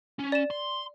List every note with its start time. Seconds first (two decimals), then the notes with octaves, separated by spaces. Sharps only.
0.19 C#4
0.32 D5 E7
0.50 C6